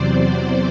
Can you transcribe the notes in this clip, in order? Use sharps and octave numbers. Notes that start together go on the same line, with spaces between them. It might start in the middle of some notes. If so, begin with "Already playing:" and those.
Already playing: E2 C3 F#3 C5 D5